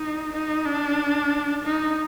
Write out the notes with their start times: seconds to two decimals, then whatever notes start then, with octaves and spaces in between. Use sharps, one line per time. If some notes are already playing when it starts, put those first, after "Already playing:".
Already playing: D#4
0.32 D#4
0.65 D4
1.64 D#4